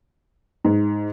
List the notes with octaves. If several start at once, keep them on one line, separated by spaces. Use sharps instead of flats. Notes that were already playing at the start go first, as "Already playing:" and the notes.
G#2